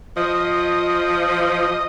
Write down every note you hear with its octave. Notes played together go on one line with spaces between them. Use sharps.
F3 D#5